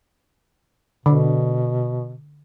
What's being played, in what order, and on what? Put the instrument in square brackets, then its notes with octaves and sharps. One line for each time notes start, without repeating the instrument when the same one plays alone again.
[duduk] B2 [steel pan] D3